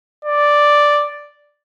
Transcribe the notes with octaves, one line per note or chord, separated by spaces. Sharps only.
D5